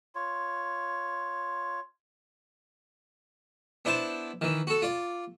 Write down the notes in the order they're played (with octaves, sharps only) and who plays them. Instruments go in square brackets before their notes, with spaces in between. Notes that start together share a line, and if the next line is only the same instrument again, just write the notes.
[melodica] F4 C#5
[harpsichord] B3 D4 E4 C5 A5
D#3 E3
F#4 A4
F4 D5